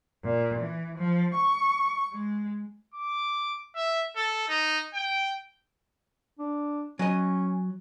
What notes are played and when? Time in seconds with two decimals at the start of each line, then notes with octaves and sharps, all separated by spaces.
0.24 A#2
0.59 E3
0.96 F3
1.34 C#6
2.13 G#3
2.94 D6
3.76 E5
4.16 A4
4.48 D#4
4.94 G5
6.39 D4
6.99 F#3 C#4 D#5